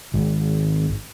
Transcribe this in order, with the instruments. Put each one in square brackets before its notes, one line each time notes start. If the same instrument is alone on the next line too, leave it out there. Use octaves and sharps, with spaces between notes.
[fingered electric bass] G#1